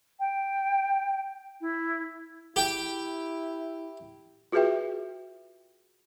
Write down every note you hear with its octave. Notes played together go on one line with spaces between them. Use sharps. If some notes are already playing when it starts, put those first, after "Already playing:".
G5
E4
E4 G4 G5
F4 F#4 G#4 B4 E5 G5